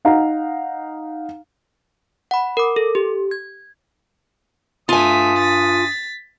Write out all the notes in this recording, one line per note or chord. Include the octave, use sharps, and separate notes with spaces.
D#4 F5 F#5 A#5
F#5 B5
A#4 D6
A4
G4
G#6
G2 A3 F4 G#5 D#6 B6
A6 B6